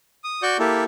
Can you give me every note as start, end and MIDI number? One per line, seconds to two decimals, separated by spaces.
0.24 0.42 87
0.42 0.57 66
0.42 0.57 74
0.42 0.57 85
0.42 0.57 91
0.59 0.84 58
0.59 0.84 64
0.59 0.84 67
0.59 0.84 69